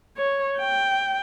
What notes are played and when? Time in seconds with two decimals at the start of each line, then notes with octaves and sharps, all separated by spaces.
0.17 C#5
0.59 G5